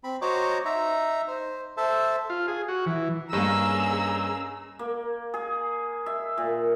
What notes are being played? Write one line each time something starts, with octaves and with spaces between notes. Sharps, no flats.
C4 B5
F#4 C5 C#5 D#5 A#5 D6
D#4 E5 A#5
C5
A4 C5 E5 A5
F4
G#4
F#4
E3
G2 A#3 C#4 G#4 D#5 A#5 E6
A#3
G#4
E5
A#2